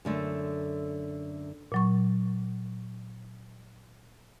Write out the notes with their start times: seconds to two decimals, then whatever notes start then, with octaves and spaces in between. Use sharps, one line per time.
0.05 F#2 D3 A3
1.72 A#2 F#3 C#6